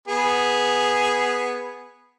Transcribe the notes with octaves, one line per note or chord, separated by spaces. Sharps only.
B3 G#4